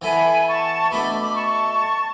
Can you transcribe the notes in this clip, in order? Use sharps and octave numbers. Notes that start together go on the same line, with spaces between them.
E3 B3 E4 A4 G#5 B5
A5 C#6
B2 A3 D4 A4 B5 D6
B5 D6
A5 C#6